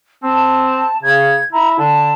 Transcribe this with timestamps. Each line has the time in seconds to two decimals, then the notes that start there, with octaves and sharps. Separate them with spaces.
0.23 C4 A5
1.03 C#3 G#6
1.53 E4 A#5
1.79 D3 A5